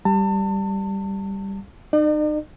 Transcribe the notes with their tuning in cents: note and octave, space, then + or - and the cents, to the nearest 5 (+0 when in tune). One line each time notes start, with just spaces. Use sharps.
G3 +0 A5 +35
D#4 -35 D5 +45